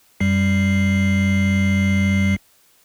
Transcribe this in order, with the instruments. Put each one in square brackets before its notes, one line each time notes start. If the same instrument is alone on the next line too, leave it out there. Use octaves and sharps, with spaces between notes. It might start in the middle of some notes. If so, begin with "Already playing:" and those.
[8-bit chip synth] F#2 G3 C7